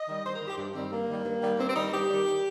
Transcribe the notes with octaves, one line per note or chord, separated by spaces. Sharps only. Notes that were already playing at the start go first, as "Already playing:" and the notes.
Already playing: D#5
D#3 G3
G2 C5
A#4
D#3 G3
G4
G2
D#3 G3 C4
G2 A#3
D#3 G3
G2
D#3 G3
G2 C4
C4
D#3 G3 D#4
G2 G4
D#3 G3